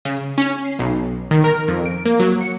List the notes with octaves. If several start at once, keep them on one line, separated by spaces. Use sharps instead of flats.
C#3
C#4
C7
B1
D#3
A#4
F2
D7
A#3
F#3
C#7